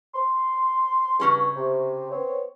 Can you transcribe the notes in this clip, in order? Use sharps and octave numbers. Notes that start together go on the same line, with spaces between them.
C6
G2 C#3 C#4 G#4
C3
B3 C4 C#5